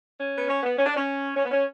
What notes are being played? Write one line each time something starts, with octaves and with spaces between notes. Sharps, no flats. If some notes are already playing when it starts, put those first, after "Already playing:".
C#4
B3
C#4
B3
C#4
D4
C#4
C#4
B3
C#4